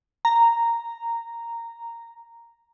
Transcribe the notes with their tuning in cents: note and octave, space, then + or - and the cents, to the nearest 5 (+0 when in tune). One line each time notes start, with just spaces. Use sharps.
A#5 -5